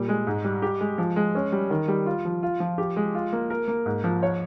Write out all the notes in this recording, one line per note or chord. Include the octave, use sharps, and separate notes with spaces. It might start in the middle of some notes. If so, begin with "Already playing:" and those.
Already playing: A#2 G3
G#3
G#2
G3
G4
G#3
F3
G#3
C#4
G3
D#3
G3
F4
F3
F4
F3
G4
G#3
F4
A#3
A#4
A#3
G#2
F3
C#5